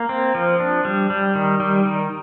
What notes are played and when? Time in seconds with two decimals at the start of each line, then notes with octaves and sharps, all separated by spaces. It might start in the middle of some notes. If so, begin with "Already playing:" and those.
Already playing: A#3
0.09 C4
0.35 F3
0.60 D4
0.85 G3
1.10 G3
1.35 D#3
1.60 G3
1.85 D#3